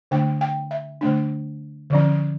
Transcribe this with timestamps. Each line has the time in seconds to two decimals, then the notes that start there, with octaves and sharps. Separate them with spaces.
0.11 D3 A3 D4 G5
0.41 G5
0.71 E5
1.01 D3 A3 D4
1.90 D3 F3 C#4